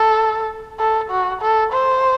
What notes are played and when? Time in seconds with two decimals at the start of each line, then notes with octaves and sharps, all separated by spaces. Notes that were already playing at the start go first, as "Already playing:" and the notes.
Already playing: A4
0.80 A4
1.10 F#4
1.41 A4
1.73 C5